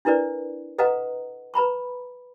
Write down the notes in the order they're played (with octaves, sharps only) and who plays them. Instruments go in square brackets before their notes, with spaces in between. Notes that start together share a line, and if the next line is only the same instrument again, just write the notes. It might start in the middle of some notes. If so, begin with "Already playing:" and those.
[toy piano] D4 E4 A#4 B4 D5
A4 B4 D#5 F5 F#5 A#5
B4 A#5 B5 C#6